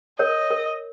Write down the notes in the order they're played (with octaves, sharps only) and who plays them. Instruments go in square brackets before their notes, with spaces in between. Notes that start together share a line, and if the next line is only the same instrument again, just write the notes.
[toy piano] A#4 C#5 [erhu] D#5
[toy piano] A#4